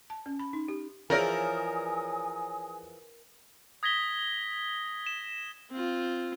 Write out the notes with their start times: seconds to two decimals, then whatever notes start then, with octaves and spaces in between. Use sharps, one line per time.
0.10 A5
0.26 C#4
0.39 B5
0.53 D#4
0.68 G4
1.10 E3 F3 G#4 A#4 C#5 D5 G#5 D#6
3.83 D#6 G#6 A#6 B6 G7
5.06 E7
5.71 C4 F4